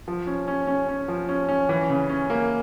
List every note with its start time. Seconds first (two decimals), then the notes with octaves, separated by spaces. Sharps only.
0.08 F3
0.27 C#4
0.48 C#4
0.67 C#4
0.88 C#4
1.08 F3
1.29 C#4
1.49 C#4
1.69 E3
1.90 C#3
2.10 C#4
2.30 A#3